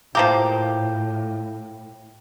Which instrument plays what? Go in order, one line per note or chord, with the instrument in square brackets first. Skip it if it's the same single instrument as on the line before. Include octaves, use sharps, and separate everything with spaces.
[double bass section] A2 [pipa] F3 A#3 G4